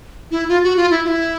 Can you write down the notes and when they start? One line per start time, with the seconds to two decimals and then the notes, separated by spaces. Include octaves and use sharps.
0.31 E4
0.49 F4
0.64 F#4
0.77 F4
0.91 E4
1.05 F4
1.08 E4